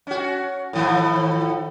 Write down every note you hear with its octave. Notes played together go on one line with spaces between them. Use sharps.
C#4 F#4
A2 D#3 F3